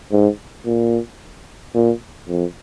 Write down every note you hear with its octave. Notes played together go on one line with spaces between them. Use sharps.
G#2
A#2
A#2
F2